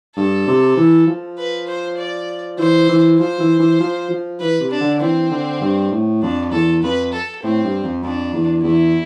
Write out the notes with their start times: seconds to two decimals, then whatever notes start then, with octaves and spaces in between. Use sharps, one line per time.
0.16 G2 A4
0.47 C3
0.77 E3
1.07 F3
1.38 B4
1.67 C5
1.98 D5
2.59 E3 C5
2.89 E3
3.19 F3 C5
3.40 E3
3.59 E3
3.80 F3
4.10 F3
4.40 E3 B4
4.60 C3
4.71 D4
4.81 D3
5.01 E3 C4
5.31 D3
5.61 G2
5.92 A2
6.22 F2 D4
6.52 E2 A4
6.83 F2 B4
7.13 A4
7.43 A2 C4
7.64 G2
7.84 F2
8.04 F2 D4
8.34 E2
8.64 E2 E4